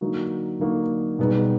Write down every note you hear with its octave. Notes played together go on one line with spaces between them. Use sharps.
D3 F#3 A#3 D#4 F#4
D3 F#3 A#3 D#4 F#4
B2 G3 B3 D#4 G#4